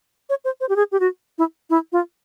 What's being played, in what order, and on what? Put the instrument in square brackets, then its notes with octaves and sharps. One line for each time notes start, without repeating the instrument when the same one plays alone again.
[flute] C#5
C5
C5
G4
G#4
G4
F#4
E4
E4
F4